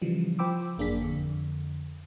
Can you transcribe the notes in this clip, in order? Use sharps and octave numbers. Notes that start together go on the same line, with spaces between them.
C#3 E3 F3 G3
F3 C5 G5 B5 D6 E6
G#1 F#2 A#3 D4 G#4 B6
F2 D3